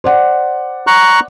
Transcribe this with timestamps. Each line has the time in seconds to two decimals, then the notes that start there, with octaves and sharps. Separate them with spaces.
0.04 C5 D5 F#5
0.87 A#5 C#6 F#6